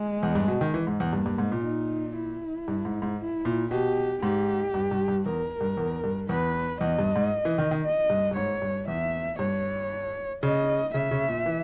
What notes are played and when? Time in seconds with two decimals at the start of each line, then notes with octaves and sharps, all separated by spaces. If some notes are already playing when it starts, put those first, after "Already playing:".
Already playing: G#3
0.23 E2
0.35 G2
0.48 B2
0.61 D#3
0.74 E3
0.87 G#2
1.00 E2
1.13 G2 A#3
1.26 G2
1.38 G#2
1.52 A#2
1.64 D#4
2.16 E4
2.68 G2
2.85 G#2
3.02 G#2
3.19 E4
3.45 A#2
3.71 B2 G4
4.23 G#2 G4
4.74 G2
4.91 G2
5.08 G2
5.26 E2 A#4
5.61 G2
5.77 E2
6.04 G2
6.29 E2 B4
6.81 E2 D#5
6.99 G2
7.16 G#2
7.45 E3
7.58 D#3
7.71 D#3
7.85 D#5
8.10 G2
8.31 G2
8.36 G#2 C#5
8.62 G2
8.88 E2 E5
9.39 G2 C#5
10.43 C#3 D#5
10.94 C#3 E5
11.11 C#3
11.28 A#2
11.46 E3